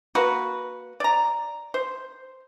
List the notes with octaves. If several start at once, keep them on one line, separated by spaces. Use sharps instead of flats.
A#3 F#4 B4
D5 A#5
C5